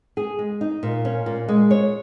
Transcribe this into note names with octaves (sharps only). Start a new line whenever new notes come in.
G#4
G#3
D#4
A#2
C#4
A#2
G#3
C#5